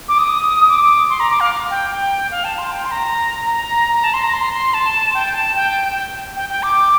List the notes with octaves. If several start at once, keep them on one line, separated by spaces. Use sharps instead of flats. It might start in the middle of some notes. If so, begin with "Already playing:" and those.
D6
D#6
D6
C6
A#5
D6
F5
G5
G5
F5
A5
C6
G5
C6
A#5
A#5
A#5
A5
C6
A#5
C6
C6
A5
G5
A5
G5
G5
G5
D6